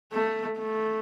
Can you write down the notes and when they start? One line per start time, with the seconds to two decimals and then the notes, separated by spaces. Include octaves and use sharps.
0.13 A3
0.58 A3